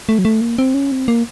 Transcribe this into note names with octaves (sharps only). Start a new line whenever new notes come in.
A3
F#3
A3
A#3
C4
C#4
C4
A#3